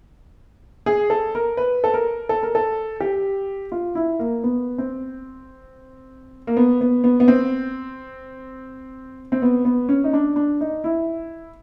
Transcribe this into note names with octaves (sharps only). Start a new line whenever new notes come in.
G#4
A4
A#4
B4
A4
A#4
A4
A#4
A4
G4
F4
E4
A#3
B3
C4
A#3
B3
B3
B3
B3
C4
C4
B3
B3
C#4
D#4
D4
D4
D#4
E4